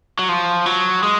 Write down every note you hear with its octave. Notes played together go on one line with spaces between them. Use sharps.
F#3
F3
F#3
G#3